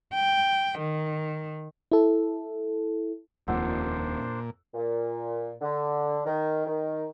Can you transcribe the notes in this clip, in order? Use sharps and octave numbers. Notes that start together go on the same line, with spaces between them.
G5
D#3
E4 A4
D#1 F2 A#2 D4 C5 F#5 E6
A#2
D3
D#3
D#3